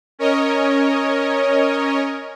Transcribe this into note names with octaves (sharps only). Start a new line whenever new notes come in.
C#4 A#4 C#5 D#5